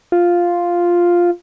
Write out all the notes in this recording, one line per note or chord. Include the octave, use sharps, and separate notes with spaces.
F4